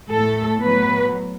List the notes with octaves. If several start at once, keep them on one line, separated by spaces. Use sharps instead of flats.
A2 A3 A4
A2 F#3 B3 B4